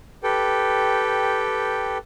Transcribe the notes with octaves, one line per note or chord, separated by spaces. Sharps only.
G4 A4 B4 G5